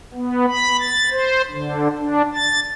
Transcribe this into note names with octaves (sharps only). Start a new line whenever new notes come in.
B3
B5
A6
C5
D3
D4
A6